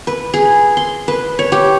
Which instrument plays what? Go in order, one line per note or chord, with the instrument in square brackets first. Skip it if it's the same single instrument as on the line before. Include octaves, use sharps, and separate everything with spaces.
[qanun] B4
G#4
C6
B4
C#5
G4